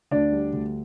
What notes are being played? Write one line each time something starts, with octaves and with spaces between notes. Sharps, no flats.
D2 D4 D5
G3
D2